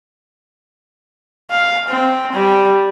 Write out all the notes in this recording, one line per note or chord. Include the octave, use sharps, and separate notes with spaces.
F5
C4
G3